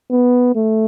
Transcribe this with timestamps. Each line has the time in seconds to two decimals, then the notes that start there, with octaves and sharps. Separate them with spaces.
0.11 B3
0.55 A3